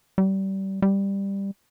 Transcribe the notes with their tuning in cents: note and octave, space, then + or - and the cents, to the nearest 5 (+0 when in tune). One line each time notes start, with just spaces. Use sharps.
G3 -25
G3 +10